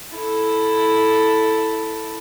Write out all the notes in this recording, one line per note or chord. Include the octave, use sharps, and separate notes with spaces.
E4 A4